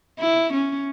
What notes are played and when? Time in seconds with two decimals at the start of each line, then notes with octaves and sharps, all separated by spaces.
0.19 E4
0.53 C#4